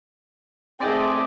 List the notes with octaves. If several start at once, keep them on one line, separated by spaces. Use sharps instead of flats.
A3 C4 G#4 D5 D#5